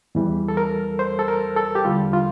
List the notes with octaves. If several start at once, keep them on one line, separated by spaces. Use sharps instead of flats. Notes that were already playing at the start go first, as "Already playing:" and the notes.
E2 E3 G3
A4
A#4
C5
A4
A#4
A4
G4
E2 D3 G3 F4
F4